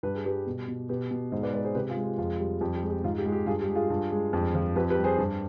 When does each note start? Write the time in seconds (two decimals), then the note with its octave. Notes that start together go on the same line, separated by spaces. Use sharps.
0.03 G2 B4
0.15 G#4
0.24 G3 G4 B4
0.47 B2
0.68 B2
0.89 B2 G4 B4
1.11 B2
1.32 G#2 C5 D#5
1.43 B4 D5
1.54 G#3 B4 D5
1.64 G#4 C5
1.75 C3 G4 B4
1.89 F4 G#4
1.97 G#3
2.03 G4
2.18 F2 F4
2.39 G3
2.61 F2 G4
2.75 G4
2.82 G#3
2.90 G4
3.04 G#2 F4
3.18 G4
3.25 G#3
3.32 G4
3.46 G2 F4 G#4
3.61 G4
3.68 G#3
3.75 F4 G#4
3.90 G2
4.11 G#3
4.33 F2
4.55 F3
4.76 F2 G4 B4
4.90 G4 B4
4.97 G3
5.04 G#4 C5
5.18 G2